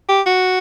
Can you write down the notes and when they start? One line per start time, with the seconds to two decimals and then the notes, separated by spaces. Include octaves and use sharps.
0.09 G4
0.26 F#4